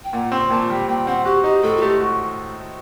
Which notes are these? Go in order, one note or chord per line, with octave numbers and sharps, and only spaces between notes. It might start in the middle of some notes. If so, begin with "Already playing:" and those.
G5
A#2 F#5
C4 G5
A#2 A5
G3 G5
A#2 G5
C4 F#5
F#4 G4
D#4 G4
A2 A4
F#4
A3 G4
F#4